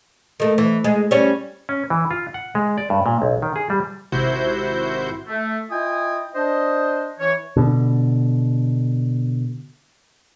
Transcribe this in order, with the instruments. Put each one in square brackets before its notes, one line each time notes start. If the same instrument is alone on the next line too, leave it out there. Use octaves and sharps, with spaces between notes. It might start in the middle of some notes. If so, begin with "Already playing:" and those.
[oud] D#3 A3
E3
G#3
G3 C#4 C#5
[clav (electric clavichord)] C#4
E3
F4
F#5
G#3
D5
G2
A#2
B1
D#3
G#4
G3
[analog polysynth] G#1 C3 E4 F#4 C5 G6
[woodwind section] A3
E4 F4 D#5 G5 G#5 D#6
D4 C5 D#5
E3 C#5
[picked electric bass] B2 D3